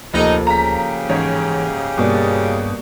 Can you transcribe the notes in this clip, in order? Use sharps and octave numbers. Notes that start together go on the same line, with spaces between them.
F1 D2 F3 A#3 D#4 A4
C#3 G4 A#5 B6
G#2 E3 C#4 C#5
G2 B2 G3 A#3 D5